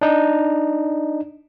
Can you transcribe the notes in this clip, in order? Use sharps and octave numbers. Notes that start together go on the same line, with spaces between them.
D4 D#4